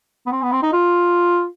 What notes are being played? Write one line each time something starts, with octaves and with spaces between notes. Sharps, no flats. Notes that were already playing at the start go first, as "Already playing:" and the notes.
B3
C4
B3
C4
D#4
F4